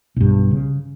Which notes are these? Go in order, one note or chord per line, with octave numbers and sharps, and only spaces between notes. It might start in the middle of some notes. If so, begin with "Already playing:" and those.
B1 G2
C#3